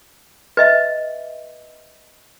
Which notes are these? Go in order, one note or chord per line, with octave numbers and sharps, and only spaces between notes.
B4 D#5 E5